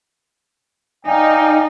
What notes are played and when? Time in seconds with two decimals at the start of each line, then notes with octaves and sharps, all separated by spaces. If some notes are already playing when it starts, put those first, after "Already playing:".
1.06 D#4 D5 F5 G5 G#5